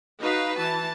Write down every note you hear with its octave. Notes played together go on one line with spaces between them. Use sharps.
D#4 F#4 B4 F5
E3 A5